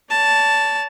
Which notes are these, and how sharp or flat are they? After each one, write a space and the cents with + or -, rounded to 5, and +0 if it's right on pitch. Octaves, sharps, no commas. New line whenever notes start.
C#5 +45 A5 +0